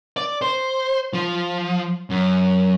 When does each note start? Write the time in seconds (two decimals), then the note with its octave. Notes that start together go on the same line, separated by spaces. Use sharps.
0.17 D5
0.42 C5
1.13 F3
2.10 F#2